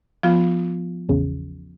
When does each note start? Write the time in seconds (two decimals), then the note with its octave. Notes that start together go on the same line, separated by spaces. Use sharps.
0.23 F3 B3 F4
1.09 A1 E2 C#3